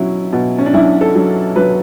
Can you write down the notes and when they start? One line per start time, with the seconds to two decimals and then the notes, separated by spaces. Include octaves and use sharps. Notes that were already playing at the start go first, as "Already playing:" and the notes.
Already playing: B2 F#3 C#4 E4
0.33 B2
0.58 C#4
0.66 D4
0.74 B1 E4
1.01 A4
1.15 F#3
1.56 F#3 B4